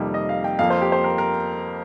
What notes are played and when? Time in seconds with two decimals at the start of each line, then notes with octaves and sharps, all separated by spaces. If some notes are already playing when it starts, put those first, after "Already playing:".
Already playing: F2 C3 D#3 G3 A#3
0.14 D#5
0.29 F5
0.44 G5
0.59 F2 F3 A#3 F5
0.70 C5
0.81 G4
0.92 C5
1.04 A#4
1.18 A#4